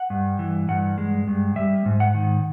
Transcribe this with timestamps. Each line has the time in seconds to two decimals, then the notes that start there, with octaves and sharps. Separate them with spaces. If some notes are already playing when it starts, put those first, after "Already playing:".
Already playing: F#5
0.10 G2
0.39 E3
0.68 G2 F#5
0.98 G#3
1.27 G2
1.56 G3 E5
1.86 G#2
2.00 F#5
2.14 D#3